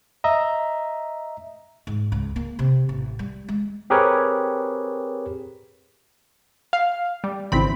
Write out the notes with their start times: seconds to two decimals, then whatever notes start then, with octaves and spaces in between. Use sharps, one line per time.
0.24 D#5 E5 A#5
1.87 G#2
2.12 C#2
2.36 A#3
2.59 C3
2.89 A1
3.19 G3
3.48 G#3
3.90 C4 G4 G#4 A#4 B4 C#5
6.73 F5
7.24 G3
7.52 G#1 C#3 E3 C4 E4 B5